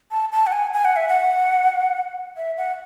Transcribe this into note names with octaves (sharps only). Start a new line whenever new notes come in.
A5
A5
F#5
G#5
G#5
F#5
E5
F#5
E5
F#5